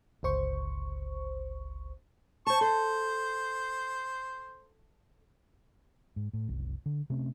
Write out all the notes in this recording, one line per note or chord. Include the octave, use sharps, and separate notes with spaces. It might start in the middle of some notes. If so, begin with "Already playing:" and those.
G1 C#2 C5 C#6
C5 A5 C#6
A4 C5
G#2
A2
F#1 C2
D3
C3 A3 C4 C#4